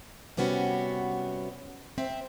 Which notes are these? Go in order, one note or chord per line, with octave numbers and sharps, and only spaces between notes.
C3 G3 B3 C#4 F#4
C4 C5 E5